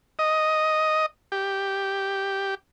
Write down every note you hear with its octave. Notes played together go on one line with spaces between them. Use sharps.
D#5
G4